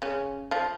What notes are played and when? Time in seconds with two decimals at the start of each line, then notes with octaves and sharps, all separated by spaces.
0.02 C#3 C#4
0.51 F3 F4